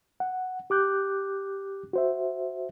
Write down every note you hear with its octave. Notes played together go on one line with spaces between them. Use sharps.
F#5
G4 D6 F#6 G6
F#4 C5 E5